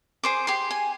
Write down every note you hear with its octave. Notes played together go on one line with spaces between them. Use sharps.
G#4 C5 D6
G4 G#4 C6
G#5